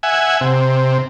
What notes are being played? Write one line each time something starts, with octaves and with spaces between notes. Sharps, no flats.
E5 F#5 G#5
C3